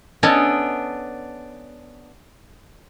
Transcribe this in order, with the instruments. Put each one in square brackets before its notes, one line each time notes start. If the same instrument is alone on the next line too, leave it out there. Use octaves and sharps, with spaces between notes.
[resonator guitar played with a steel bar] B3 C#4 D4 [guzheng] A4 D#5 G#5